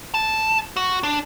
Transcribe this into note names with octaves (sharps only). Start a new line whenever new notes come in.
A5
F#4
D4